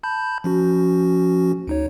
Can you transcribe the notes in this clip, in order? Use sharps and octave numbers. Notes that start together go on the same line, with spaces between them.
A5 B5 G6
F3 C#4 F#4
D2 D#4 C#5